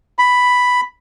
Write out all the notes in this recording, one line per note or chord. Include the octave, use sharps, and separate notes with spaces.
B5